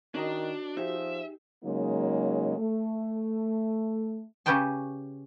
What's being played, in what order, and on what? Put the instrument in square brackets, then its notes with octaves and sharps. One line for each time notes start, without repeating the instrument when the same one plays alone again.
[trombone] D#3 [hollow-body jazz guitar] C#4 A#4 D#5 [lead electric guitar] D4 [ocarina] F#4
[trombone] F3 [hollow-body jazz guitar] D#4 G4 G#4 [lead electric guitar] E5
[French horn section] C#3 F#3 G#3 A#3 D#4
A3
[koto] C#3 C#4 G4 B4 G5 A5